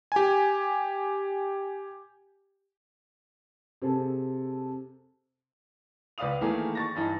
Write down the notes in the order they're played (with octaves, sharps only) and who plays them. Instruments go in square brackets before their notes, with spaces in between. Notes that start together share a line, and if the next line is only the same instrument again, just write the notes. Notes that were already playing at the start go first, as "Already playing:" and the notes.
[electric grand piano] G4 G#5
[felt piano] C3 C4 G#4 A4
[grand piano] C#2 B4 D5 F5 D#6 F7
D#3 E3 A3 A#3 G#4
C#6 A6 A#6
G2 E3 D#4